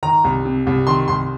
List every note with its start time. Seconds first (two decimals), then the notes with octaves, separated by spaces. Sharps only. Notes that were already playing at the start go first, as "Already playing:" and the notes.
0.03 D#3 A#5
0.24 C2
0.45 C3
0.67 C2
0.87 D#3 C6
1.08 C2 C6